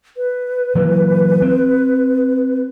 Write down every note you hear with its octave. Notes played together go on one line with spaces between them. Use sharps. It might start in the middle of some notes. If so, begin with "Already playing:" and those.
B4
E3 F#3 A#3
C4